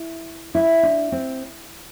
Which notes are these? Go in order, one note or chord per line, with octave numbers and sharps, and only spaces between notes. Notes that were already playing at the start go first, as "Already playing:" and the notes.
Already playing: E4
E4
D4
C4